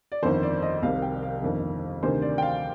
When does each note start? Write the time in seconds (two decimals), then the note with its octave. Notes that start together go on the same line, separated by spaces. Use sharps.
0.12 D5
0.23 G1 F2 D#3 C5
0.43 D5
0.62 D#5
0.83 C2 C3 D#3 F5
1.02 G5
1.23 F5
1.42 G1 F2 D#3
2.03 D2 C3 D#3 C5
2.22 D5
2.38 G5
2.42 F5